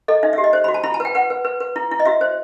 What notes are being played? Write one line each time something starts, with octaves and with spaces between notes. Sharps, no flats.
A4 D#5
D#4 E5
E5
G4
D#5
C5
F#4 B5
A5
E4 B5
A5
B4 G5
B4 F#5
B4
B4
B4
E4
E4
D#5
F#4 E5
C5